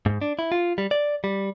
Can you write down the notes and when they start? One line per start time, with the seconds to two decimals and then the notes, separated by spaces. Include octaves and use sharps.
0.06 G#2
0.21 D4
0.39 E4
0.52 F4
0.78 G3
0.91 D5
1.24 G3